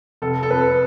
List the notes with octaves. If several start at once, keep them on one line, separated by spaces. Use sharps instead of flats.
F1 A4
A4
F2 B4